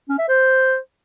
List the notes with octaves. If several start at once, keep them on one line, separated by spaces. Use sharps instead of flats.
C#4
E5
C5